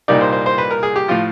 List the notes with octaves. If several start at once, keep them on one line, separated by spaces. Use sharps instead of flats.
C2 A#2 G3 A#3 D#4 D5
C5
C5
C5
B4
A#4
G#4
G4
A2 F3 F4